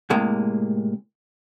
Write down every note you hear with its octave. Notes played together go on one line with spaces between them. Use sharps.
A2 C3 G#3 A#3